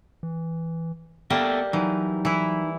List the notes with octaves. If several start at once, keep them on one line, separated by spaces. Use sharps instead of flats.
E3
G3 A#3 B3 G4 A4 D5 E5
E3 F#3 D#4
E3 E4